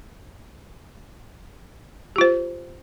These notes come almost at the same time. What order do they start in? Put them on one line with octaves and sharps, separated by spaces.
G4 F4 C5